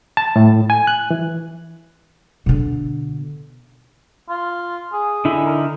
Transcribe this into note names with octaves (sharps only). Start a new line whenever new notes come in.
A5
A2
G#5
F#6
E3
B2 D3
F4
G#4
D3 D#4 E4
A#4